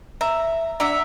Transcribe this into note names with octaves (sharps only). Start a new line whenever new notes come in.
E5 A#5
D4 E5 F#5 A#5